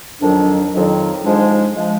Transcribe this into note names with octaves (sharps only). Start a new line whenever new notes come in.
F2 D#3 F#3 D4
F2 D#3 F#3
G#2 F3 G#3 D4
F3 G#3